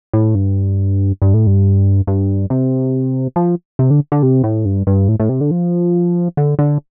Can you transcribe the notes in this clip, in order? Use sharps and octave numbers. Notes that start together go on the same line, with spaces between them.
A2
G2
G2
A2
G2
G2
C3
F3
C3
D3
D3
C3
A2
G2
G2
A2
A2
C3
D3
F3
D3
D3